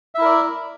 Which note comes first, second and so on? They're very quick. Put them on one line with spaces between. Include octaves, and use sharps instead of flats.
E5 E4 A#4 D5